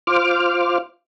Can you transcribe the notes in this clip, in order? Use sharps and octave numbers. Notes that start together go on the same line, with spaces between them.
F4 C5 D6 F6